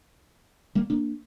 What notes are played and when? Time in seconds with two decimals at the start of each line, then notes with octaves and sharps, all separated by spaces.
0.75 G3 A#3
0.90 A#3 D4